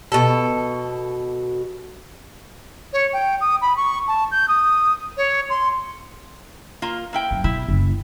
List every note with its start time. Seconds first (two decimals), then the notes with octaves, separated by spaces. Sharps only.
0.12 B2 A4
2.93 C#5
3.13 G5
3.41 D#6
3.62 B5
3.77 C#6
4.08 A5
4.32 G6
4.48 D#6
5.17 C#5
5.50 C6
6.82 A#3 F4
7.13 A#3 E4 G5
7.31 F#2
7.44 B2 E4
7.68 F#1